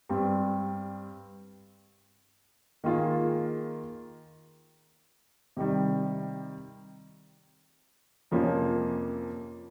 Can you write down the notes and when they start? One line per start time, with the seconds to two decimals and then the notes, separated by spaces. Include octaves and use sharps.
0.09 G2 G3 C4
2.84 D#3 A#3 F4 G#4
5.57 C3 D#3 G3
8.31 F2 C3 F3 A#3 C#4